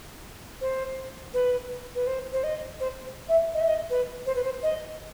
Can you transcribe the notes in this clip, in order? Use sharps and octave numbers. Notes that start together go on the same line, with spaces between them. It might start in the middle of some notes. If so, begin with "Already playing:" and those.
C5
B4
B4
C5
C5
D#5
C5
E5
D#5
E5
D#5
B4
C5
B4
C5
D#5